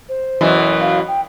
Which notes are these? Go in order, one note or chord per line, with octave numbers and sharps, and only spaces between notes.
C5
F#2 B2 E3
F5
G5